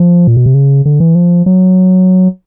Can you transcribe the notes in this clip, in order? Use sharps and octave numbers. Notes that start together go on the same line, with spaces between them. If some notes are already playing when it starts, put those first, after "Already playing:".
Already playing: F3
A#2
B2
C3
C#3
D3
E3
F3
F#3